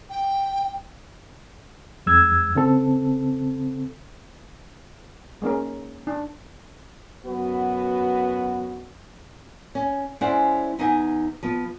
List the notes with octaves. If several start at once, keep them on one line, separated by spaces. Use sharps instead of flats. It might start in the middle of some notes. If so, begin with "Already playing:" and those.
G5
F2 G#3 E6 G#6
C#3 C4 A4
G#3 A#3 C#4 A#4
D4
F#2 B3 F#4 B4
C#4
G#3 C#4 E4 C5 D5 F#5
E2 D#4 B4 F#5 G#5
F3 B3